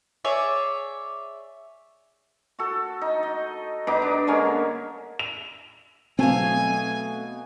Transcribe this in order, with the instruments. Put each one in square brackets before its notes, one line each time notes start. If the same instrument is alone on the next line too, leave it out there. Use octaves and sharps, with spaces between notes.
[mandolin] G#4 C#5 D5 E5
[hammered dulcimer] F#4 A4
D#4
D#5
G2 B3 D#4 D6
D4
D3 G#3 A#3 C#4
[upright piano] F7
[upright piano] B2 F#3 [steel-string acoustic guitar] A3 F5 [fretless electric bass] C4 [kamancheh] G#5